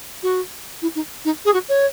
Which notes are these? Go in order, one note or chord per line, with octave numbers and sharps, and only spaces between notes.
F#4
E4
D#4
D#4
G#4
F#4
C#5